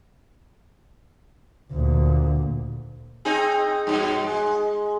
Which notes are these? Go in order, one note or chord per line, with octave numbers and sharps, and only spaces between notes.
D2 A#2
C4 D#4 G#4
G2 B2
G#3